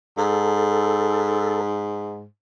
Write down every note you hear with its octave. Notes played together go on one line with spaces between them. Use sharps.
G#2 A4